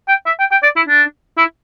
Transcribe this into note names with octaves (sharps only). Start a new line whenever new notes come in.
G5
E5
G5
G5
D5
E4
D4
E4